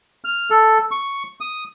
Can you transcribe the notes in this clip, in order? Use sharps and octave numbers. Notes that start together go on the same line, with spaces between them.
F6
A4
C#6
D#6